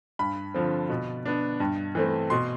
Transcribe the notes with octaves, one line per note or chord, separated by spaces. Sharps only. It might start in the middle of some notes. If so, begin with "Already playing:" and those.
G2 B5
D3 F3 C4
B2
B3 D4
G2
E3 A3 C4
B2 C6